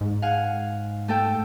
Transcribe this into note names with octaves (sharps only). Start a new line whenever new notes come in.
G#2
F5 F#5 G#5
A3 A4 G5